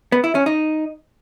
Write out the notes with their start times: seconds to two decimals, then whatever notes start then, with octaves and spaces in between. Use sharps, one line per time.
0.12 B3
0.24 E4
0.35 C#4
0.46 D#4